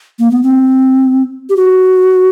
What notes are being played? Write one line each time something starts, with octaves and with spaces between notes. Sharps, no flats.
A#3
B3
C4
G4
F#4